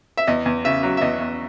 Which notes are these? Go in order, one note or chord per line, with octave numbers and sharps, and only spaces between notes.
E5
E2 D#5
E2
C#3 E5
F#3
E5
E2 D#5
E2